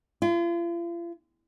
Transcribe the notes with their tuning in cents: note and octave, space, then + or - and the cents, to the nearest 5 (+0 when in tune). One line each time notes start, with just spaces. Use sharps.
F4 -40